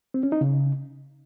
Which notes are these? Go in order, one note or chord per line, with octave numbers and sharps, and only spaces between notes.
C4
C#4
D#4
C#3